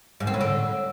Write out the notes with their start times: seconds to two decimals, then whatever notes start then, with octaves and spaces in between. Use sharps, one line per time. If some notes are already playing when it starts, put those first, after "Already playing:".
0.20 G#2
0.27 C4
0.34 A2
0.41 D3